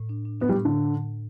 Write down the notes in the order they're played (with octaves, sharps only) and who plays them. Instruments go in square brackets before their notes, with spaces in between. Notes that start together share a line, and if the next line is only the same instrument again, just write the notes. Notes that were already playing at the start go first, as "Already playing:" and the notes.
Already playing: [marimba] A2
D4
D4
[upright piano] B3 [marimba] D4
[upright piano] G3
[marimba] A2
[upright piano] D3